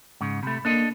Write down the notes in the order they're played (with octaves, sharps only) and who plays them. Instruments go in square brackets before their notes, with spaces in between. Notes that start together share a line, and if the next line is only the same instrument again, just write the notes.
[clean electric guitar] G#2 C#3
[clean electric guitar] C3 A3 [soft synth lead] B5
[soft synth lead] A#3 [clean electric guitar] D4 A4 D#5